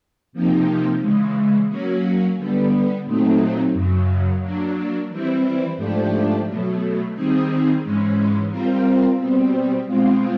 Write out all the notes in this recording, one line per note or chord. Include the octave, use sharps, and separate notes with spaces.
C3 F3 A#3 D#4 G4
C#3 E3 G#3
F#3 A#3 C#4 F#4
D3 G3 B3
A#2 F#3 A3 C4 D#4
F#2 C#3 F#3
F#3 A#3 D4
E3 G3 C4 E4
G#2 F3 A3 D4 G4
B2 F#3 A3
D#3 G3 C4 D#4 G#4
G#2 E3 G#3 C#4
G3 C4 F4 A#4
B2 G3 C4
B2 G#3 C4 F4